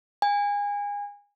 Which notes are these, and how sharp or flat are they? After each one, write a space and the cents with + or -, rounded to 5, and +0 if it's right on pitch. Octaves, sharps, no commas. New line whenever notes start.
G#5 -30